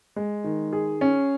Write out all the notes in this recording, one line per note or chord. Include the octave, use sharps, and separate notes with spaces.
G#3
D#3
G#4
C#4